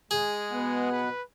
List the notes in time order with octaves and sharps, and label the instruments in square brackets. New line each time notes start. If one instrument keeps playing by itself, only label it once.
[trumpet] G#3 [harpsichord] G#4
[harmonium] B2 B3 F#5
[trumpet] B4